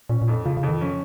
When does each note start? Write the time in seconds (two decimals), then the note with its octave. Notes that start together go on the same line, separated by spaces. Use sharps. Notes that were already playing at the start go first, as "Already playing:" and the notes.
0.09 A#2 C#4
0.22 A#2
0.28 F2
0.45 C#3 F3
0.57 C#3
0.63 F2
0.69 D#3
0.81 F3 C#4